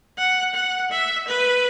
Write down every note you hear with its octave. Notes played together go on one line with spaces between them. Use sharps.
F#5
F#5
E5
B4